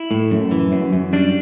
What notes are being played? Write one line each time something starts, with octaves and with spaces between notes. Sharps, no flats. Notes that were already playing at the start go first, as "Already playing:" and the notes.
Already playing: E4
A2
F#2
E3
F#2
F#2
G3 D4